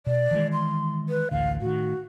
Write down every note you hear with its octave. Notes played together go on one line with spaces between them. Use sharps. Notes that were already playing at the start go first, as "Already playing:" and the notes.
B2 D5
D#3 E3 G#3
C6
B4
A1 D2 D3 F5
A2 D#3 F#4